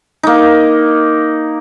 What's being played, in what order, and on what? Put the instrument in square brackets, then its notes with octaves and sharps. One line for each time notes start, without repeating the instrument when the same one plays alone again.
[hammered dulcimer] A#3 D#4